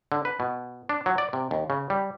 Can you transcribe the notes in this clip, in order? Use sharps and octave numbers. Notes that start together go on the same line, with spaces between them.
D3
B4
B2
D4
F#3
D5
C3
D#2
C#3
G3